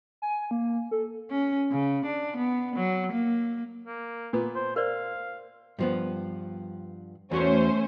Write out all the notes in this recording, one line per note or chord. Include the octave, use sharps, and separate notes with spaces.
G#5
A#3
A4
C#4
C#3
D4
B3
F#3
A#3
A#3
A#2 B3
C5
A#4 C5 D5 F5
G2 F3 B3
E2 A3 C#4 F#4 C5 C#5